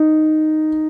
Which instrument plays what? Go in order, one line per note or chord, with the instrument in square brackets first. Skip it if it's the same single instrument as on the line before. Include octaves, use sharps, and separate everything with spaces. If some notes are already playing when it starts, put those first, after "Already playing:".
Already playing: [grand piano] D#4